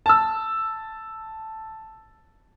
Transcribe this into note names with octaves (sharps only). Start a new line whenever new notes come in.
A5 E6